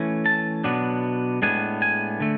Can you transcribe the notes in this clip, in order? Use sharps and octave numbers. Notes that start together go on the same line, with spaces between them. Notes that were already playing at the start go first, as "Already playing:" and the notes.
Already playing: E3 A3 C#4
A5
B2 F#3 B3 D4
A2 G#3 B3 D4 G#5
G#5
D3 A3